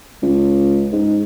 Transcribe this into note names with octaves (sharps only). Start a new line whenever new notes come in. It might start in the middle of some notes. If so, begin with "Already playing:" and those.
C#2
G#2